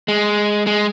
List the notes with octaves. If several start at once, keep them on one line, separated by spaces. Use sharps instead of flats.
G#3
G#3